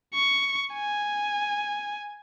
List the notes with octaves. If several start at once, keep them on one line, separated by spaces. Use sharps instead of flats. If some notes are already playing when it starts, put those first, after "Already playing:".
C#6
G#5